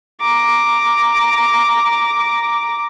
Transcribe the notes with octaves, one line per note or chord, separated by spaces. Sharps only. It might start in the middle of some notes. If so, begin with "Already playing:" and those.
A#5 D6